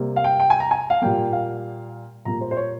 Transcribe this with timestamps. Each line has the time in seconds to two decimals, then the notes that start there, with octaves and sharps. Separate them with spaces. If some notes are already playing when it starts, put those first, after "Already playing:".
Already playing: C3 G3 A#3
0.16 F5
0.24 G5
0.40 G5
0.50 G#5
0.60 A#5
0.71 G#5
0.90 F5
1.02 A#2 G3 A#3 G5
1.33 F5
2.25 A#2 G3 A#3 A#5
2.41 C5
2.51 C5
2.56 C#5